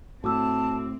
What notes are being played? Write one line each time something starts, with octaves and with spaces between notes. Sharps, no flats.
A2 C4 F#4 A5 D6 E6